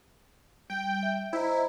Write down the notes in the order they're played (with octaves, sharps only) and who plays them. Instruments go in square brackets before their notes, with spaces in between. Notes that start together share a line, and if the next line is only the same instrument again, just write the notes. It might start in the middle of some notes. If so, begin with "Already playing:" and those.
[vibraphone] G3 [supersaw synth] G5
[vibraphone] E5
[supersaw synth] E4 [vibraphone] C5 D#5 A#5